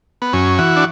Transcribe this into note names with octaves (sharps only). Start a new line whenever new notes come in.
B3
F#2 C#4
E3 F#4
D4